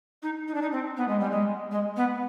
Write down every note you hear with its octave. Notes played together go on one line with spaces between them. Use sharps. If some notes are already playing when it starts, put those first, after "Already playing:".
D#4
D#4
D4
D#4
C4
B3
G#3
G3
G#3
G#3
B3